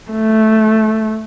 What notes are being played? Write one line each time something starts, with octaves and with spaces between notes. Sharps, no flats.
A3